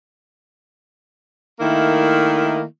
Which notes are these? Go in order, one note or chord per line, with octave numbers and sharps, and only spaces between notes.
D#3 A3 A#3 E4